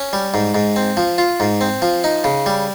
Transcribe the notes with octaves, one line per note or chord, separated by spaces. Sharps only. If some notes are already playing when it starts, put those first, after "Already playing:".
Already playing: C#4
G3
G#2
G#2
C4
F3
F4
G#2
C4
F3
D#4
C#3
G3